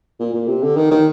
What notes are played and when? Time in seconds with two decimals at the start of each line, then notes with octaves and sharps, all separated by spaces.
0.20 A#2
0.34 A#2
0.48 C3
0.63 D3
0.77 D#3
0.91 D#3